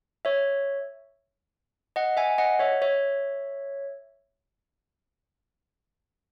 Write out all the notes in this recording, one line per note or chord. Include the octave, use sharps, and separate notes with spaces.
C#5 E5
D#5 F#5
E5 G#5
D#5 F#5
C#5 E5
C#5 E5